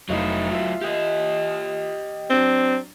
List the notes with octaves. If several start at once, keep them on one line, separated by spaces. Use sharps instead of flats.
F1 F#3 D#4 E4 F5
F4 E5
G4 D#5
F#3 C4 D4 G7